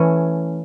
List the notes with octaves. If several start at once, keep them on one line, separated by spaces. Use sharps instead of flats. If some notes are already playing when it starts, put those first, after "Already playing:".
Already playing: E3 A3 C#4